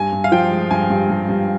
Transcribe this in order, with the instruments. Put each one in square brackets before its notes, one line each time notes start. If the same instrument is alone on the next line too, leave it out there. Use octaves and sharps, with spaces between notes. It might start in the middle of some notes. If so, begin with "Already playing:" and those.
Already playing: [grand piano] G2 G#5
G2
F5
F3 G5
G#3
G2 G#5
G2
G2
G2